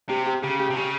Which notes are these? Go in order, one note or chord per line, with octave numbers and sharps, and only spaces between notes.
C3 G4
G4
C#3 G4
G4
C3
C#3 G4